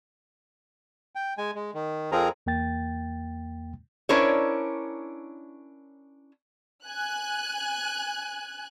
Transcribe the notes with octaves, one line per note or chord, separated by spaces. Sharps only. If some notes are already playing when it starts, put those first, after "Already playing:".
G5
G#3 G#5
G#3
D#3
F2 F3 C4 G#4 A#4 A#5
E2 A#3 G5 A6
C#4 D4 E4 A#4 C5 C#5
G#5 F#6